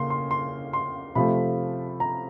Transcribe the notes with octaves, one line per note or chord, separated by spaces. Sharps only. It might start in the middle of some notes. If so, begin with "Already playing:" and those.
Already playing: C#3 A#3 C6
C6
C6
C6
C3 F3 A3 B5
A#5